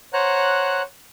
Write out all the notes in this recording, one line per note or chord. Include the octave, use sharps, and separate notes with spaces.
C5 C#5 F#5 A#5 F#6